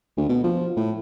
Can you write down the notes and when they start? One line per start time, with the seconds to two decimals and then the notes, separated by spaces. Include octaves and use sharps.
0.17 D2
0.29 B2
0.44 F3
0.77 A2